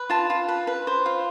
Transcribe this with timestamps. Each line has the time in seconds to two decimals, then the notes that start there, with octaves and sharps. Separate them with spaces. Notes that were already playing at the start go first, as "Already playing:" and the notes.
Already playing: B4
0.10 F4 A5
0.30 F4
0.48 B4
0.67 B4
0.87 C5
1.06 F4